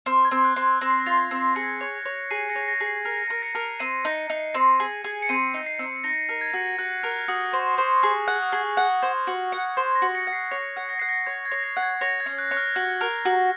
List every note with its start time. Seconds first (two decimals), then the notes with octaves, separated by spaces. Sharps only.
0.06 C4 F6
0.25 G#6
0.31 C4
0.44 F#6
0.56 C4
0.63 G#6
0.81 C4 A#6
0.90 C7
1.00 A#6
1.06 F4
1.18 G#6
1.31 C4
1.55 G#4 A#6 C#7
1.81 C#5
2.05 C#5
2.30 G#4 C7 D#7
2.49 A#6 C#7
2.55 C#5
2.63 C7
2.68 A#6
2.80 G#4
2.86 C7
3.05 A#4 C7
3.30 A#4
3.42 A#6 C#7
3.55 A#4
3.79 C4 C7 D#7
4.05 D#4
4.30 D#4
4.54 C4
4.80 G#4
5.04 G#4
5.22 C#7
5.29 C4 C7 D#7
5.54 D#4
5.66 C7
5.79 C4
6.04 D#4 A#6
6.29 A#4
6.41 G#6
6.53 F#4
6.78 F#4 F#6
7.03 A#4 F6
7.28 F#4 D#6
7.53 C5 C#6
7.78 C5 C#6
7.96 C#6
8.02 G#4 D#6
8.28 F#5 F#6
8.35 F6
8.42 D#6
8.50 G#4 F6
8.77 F#5
9.02 C5 G#6
9.27 F#4
9.52 F#5
9.77 C5
9.91 G#6
9.95 A#6
10.02 F#4
10.14 A#6 C#7
10.27 F#5
10.33 C7
10.51 C#5 A#6
10.76 F#5
10.89 A#6
10.99 F#5 C7
11.09 A#6
11.26 C#5 G#6
11.45 G#6
11.51 C#5
11.63 A#6
11.76 F#5
11.82 G#6
12.01 C#5 A#6
12.20 G#6
12.26 C#4
12.38 F#6
12.51 C#5
12.57 F6
12.75 F#4 F6
13.01 A#4
13.25 F#4